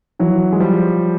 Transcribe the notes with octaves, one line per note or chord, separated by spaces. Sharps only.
E3 F#3
G#3
F3 G3